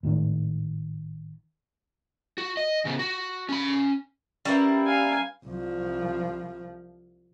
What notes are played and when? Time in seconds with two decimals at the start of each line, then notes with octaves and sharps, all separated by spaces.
0.03 G#1 A2 C3 D#3
2.38 F#4
2.57 D#5
2.85 C#3 B3
2.99 F#4
3.49 C#4 B5
4.45 G3 A#3 C#4 E4 B4
4.86 F5 G#5
5.45 C2 F3